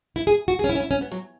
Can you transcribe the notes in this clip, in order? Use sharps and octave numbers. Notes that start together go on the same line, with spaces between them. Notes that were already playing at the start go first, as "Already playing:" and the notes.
E4
G#4
F#4
G#4
C#4
E4
C#4
E4
C#4
B3
F#3